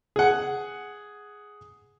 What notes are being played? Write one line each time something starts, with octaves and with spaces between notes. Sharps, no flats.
G#4 F#5